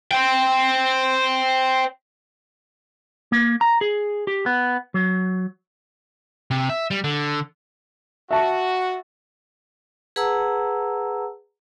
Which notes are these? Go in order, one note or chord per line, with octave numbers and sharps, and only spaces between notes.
C5 G5
A#3
A#5
G#4
G4
B3
F#3
C3
E5
G3
D3
F#4 E5 A5
G#4 B4 F#5 A5 A#5 E6